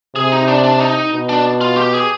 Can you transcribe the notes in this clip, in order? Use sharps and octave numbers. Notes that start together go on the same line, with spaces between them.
C3 G#4
D#4
D4
D4
D#4
B2
D4
F4
G4
G#4